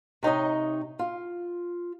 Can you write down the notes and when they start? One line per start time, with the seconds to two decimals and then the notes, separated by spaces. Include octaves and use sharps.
0.23 C3 D#4 C#5 D#5
0.99 F4